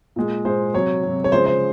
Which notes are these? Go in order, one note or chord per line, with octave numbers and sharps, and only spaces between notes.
A#2 G#3
A#2 G#3 C5
C3 F#3 C#5
C3 F#3
C#5
C#3 F3 G#3 C5
C5